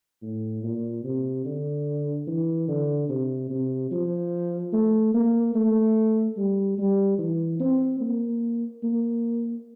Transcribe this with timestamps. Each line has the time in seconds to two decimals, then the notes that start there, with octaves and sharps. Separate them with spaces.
0.22 A2
0.63 A#2
1.04 C3
1.45 D3
2.27 E3
2.68 D3
3.09 C3
3.50 C3
3.91 F3
4.73 A3
5.14 A#3
5.55 A3
6.37 G3
6.78 G3
7.18 E3
7.60 C4
8.01 A#3
8.83 A#3